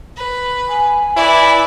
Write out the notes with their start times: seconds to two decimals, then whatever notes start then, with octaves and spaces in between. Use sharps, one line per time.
0.17 B4
0.68 G#5
1.17 E4 B4 D5